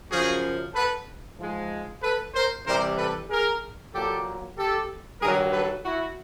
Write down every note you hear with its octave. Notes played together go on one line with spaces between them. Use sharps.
F#2 C#3 F3 F#4 G#4
A4 B4
G#2 F3 G#3
A4 B4
A#4 C5
C3 E3 G3 A#4 C5
A4 B4
G#4 A#4
A#2 F#3 G4 A4
G4 A4
G2 D#3 F#3 G#4 A#4
A4 B4
E4 F#4